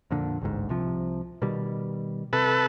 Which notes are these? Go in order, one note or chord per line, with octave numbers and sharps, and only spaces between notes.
F2 A#2 D3
A1 D2 G#2
C2 C3 F3
B2 D#3 G3
C3 A4 B4